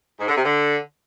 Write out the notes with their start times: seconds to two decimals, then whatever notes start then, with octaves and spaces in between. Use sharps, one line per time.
0.20 G#2
0.28 D3
0.36 C3
0.44 D3